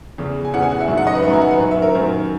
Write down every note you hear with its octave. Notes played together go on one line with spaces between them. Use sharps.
E2 C#3 E3
G#5
E2 C#3 E3 F#5
G#5
F#5
E5
F#2 D#3
F#5
D#5
B4
F#2 D#3 E5 A#5
G#5
F#5
B4
F#2 D#3
E5
A#4
F#2 D#3 A#4